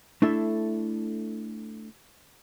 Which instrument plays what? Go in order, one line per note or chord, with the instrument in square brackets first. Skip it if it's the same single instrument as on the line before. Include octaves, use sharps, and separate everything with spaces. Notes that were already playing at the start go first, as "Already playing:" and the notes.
[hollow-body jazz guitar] A3 D4 E4 A4 E5